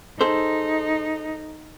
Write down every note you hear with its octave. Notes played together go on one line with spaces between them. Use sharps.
D#4 G#4 A4 C5